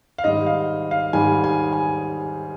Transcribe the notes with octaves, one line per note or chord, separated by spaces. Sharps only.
F5
G#2 D#3 G3 D#5
F5
F5
G#2 D#3 G3 G#5
G#5
G#5